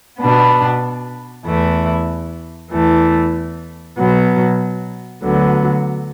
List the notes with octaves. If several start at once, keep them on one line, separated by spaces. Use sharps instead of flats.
B2 B3 D4
E2 E3 A3 E4
E2 E3 A3
B2 F#3 B3
D2 D3 F#3 B3